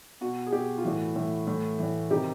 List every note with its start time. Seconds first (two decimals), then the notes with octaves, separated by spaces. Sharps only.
0.21 B2 F#4
0.46 G#4
0.52 B2 G4
0.78 F4
0.84 A2 E3 F#4
1.16 A2 E3
1.47 A2 E3
1.79 A2 E3
2.11 C3 D#3 G4